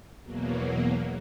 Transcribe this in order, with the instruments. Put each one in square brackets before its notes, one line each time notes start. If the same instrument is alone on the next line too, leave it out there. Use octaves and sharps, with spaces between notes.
[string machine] E2 B2 F#3 A#3